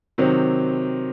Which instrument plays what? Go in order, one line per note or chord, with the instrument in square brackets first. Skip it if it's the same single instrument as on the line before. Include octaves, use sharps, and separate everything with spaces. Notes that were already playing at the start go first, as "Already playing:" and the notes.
[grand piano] C3 D#3 F#3 C4